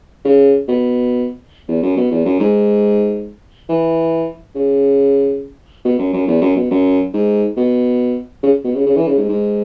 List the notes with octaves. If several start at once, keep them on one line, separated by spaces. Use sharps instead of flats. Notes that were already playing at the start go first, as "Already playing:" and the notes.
C#3
B2
E2
F#2
B2
E2
F#2
G#2
E3
C#3
B2
F#2
F#2
E2
F#2
B2
F#2
G#2
B2
C#3
B2
C#3
C#3
E3
C#3
G#2
G#2